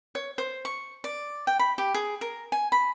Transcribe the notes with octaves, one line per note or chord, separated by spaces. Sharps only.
C#5
C5
C#6
D5
G5
B5
G4
G#4
A#4
G#5
B5